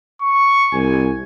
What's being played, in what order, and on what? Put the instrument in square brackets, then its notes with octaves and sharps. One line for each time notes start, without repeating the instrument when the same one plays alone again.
[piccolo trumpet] C#6
[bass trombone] C2 [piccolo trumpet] G#5